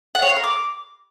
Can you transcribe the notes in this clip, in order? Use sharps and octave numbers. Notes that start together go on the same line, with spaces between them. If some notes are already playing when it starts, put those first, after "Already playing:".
F#5
C#5
F5
A#4
D6